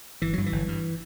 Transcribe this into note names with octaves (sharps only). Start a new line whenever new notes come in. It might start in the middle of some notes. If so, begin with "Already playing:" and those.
G1 E3
G2 F#3
E3
G1
G2